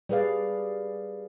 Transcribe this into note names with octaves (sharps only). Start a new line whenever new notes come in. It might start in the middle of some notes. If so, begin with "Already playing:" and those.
G3 G#4 B4 D5 F5